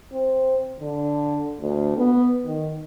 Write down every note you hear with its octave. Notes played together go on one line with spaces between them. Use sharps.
C4
D3
D2
B3
D#3